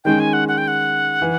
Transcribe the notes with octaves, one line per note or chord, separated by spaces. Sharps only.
D#3 G#3 C#4 G5
G#5
F#5
F#5
G5
F#5
E3